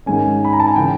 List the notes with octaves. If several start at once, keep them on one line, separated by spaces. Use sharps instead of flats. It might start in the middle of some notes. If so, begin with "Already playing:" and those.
G#2 D#3 G#3 C#4 G#5
B5
A#5
A5
G#5
C#3 E3 G5